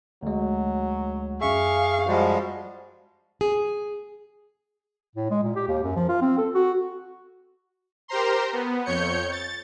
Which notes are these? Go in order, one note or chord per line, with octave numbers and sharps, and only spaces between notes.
D2 F#3 G#3
F#2 G#4 E5 F5 C#6
F3 G3 G#3 F#4
G#4
A2
G#3
A#2
G4
D#2
F#2
F3
F4
C4
A4
F#4
G4 A#4 C5 A#5 C6
B3
F2 C#5 G6 C#7
A6